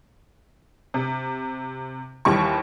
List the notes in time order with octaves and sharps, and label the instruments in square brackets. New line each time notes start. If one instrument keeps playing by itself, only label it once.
[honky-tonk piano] C3
D#2 E3 G3 C#6